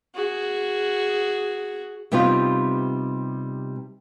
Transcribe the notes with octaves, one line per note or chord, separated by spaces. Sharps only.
F#4 G#4
C3 G3 B3 D#4 F4